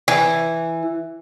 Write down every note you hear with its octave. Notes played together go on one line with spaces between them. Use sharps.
E3